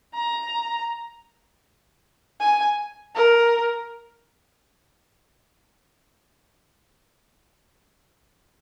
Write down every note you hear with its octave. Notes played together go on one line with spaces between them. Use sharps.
A#5
G#5
A#4